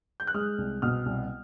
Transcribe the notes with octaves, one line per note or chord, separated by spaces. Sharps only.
G6
F#6
G#3 D#6 F6
C2
B2 D#6 F6
C2